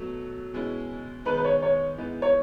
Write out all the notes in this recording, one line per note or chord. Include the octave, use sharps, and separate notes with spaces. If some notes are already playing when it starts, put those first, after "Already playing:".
Already playing: B2 F#3 A3
B2 G#3 C#4 E4
D#3 G#3 B3 D#4 B4
B4
C#5
C#5
G#2 E3 B3 D#4
C#5